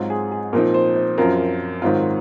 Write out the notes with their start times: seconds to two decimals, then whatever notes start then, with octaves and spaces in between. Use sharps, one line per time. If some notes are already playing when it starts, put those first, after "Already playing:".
Already playing: G#2 F#3 C4 F4
0.10 G#4
0.32 G#4
0.53 A#2 F3 C4 D#4 A#4
0.74 C5
0.95 C5
1.18 F#2 F3 C4 F4 A#4
1.82 G#2 D#3 F#3 C4 F4